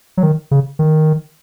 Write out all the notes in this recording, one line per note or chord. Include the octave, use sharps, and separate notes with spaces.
F#3
D#3
C#3
D#3